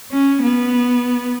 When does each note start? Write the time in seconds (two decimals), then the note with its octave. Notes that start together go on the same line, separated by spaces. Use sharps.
0.11 C#4
0.42 B3